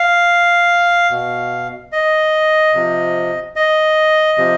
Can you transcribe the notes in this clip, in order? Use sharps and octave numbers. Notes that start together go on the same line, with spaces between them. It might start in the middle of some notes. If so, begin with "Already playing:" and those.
Already playing: F5
B2
D#5
C3 F3
D#5
C3 F3